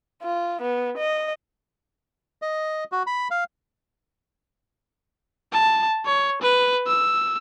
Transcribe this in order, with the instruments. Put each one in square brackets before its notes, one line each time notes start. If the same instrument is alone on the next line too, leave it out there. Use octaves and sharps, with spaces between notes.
[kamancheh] F4
B3
D#5
[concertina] D#5
F#4
B5
F5
[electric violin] A5
C#5
B4
E6